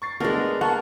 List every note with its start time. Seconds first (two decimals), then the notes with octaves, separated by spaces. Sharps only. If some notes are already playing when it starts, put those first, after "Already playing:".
0.02 C#6 A6 C7
0.20 G#3 A3 B3 D4 A#4
0.61 A#3 F#5 A5 C#6